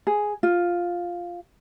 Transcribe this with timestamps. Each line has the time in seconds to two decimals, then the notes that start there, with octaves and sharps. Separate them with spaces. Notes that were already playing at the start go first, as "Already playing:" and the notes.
0.07 G#4
0.43 F4